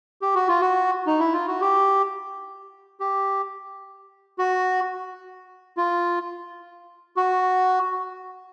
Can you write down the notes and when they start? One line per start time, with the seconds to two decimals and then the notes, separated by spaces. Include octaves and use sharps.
0.22 G4
0.35 F#4
0.48 F4
0.61 F#4
1.07 D#4
1.20 E4
1.33 F4
1.48 F#4
1.61 G4
3.00 G4
4.39 F#4
5.77 F4
7.17 F#4